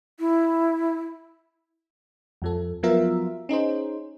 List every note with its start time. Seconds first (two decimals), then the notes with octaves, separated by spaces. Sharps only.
0.20 E4
2.42 F2 F3 A4
2.83 F3 F#3 B3 F4 A#4 E5
3.49 C#4 D#4 G#4 C5